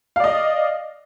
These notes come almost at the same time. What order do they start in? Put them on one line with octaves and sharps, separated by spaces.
F5 D5 D#5